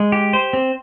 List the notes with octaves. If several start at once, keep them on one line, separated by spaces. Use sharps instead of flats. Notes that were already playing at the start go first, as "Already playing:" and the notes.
Already playing: G#3
G4
C5
C4